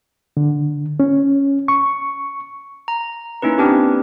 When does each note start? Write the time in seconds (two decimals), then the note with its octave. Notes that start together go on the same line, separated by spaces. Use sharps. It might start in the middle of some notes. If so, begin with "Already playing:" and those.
0.37 D3
1.00 C#4
1.68 C#6
2.88 A#5
3.42 A#3 C#4 D#4 E4 B4
3.58 C4 D4 G4 B4